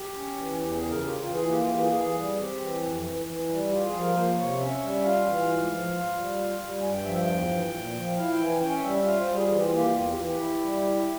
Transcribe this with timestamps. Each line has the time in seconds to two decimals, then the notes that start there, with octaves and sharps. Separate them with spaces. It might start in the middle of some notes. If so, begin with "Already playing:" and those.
Already playing: G4
0.14 C#4
0.36 E3
0.58 E2 G4
0.74 G#4
0.81 C#3
0.88 A#4
1.03 F4 G4
1.19 F4
1.26 E3
1.33 G#4
1.48 A#3 G4
1.59 F4
1.70 E3 G4
1.81 G#4
1.92 E3 G#4
2.14 G3
2.36 C4 G4
2.59 E3
2.82 F2
3.04 E3
3.26 E3
3.48 G3
3.70 F4 G4
3.85 G#4
3.92 F3
4.00 A#4
4.15 A#3 C5
4.37 C3 C#5
4.60 C#4 E5
4.81 G3
5.04 F4 F5
5.26 E3
5.48 G#2
5.71 F3
5.92 F4
6.15 G3
6.37 F4
6.60 G3
6.82 G2 G#5
6.93 G5
7.04 F3 E5
7.15 G5
7.26 E2
7.48 E3
7.71 A#2
7.93 F3
8.15 E4 F5
8.31 G5
8.37 E3
8.45 G#5
8.60 C#4 G5
8.74 E5
8.82 G3
8.89 E5
9.04 F4 F5
9.19 C5
9.27 G3
9.34 G#4
9.48 E3 G#4
9.56 G4
9.64 F4
9.71 A#3 G4
9.93 E2 F4
10.08 G4
10.16 E3
10.23 G4
10.38 E4
10.61 G3
10.82 E4